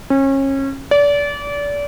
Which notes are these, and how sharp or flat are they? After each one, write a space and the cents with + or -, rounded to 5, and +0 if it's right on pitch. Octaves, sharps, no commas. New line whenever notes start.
C#4 -30
D5 -30